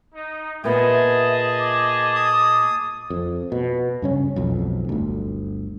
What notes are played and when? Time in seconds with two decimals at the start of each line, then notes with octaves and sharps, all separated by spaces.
0.14 D#4
0.64 A#2 B3 G#4 D#5 E5 A5
1.59 D6
2.16 D#6
3.10 F2
3.52 B2
4.02 G2 C#3 C#4
4.36 B1 F2 G#2
4.89 G1 D2